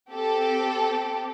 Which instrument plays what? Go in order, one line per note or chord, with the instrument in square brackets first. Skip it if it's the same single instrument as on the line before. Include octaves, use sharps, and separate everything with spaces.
[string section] C4 G4 A4